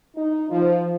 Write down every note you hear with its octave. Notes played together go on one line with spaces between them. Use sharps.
D#4
F3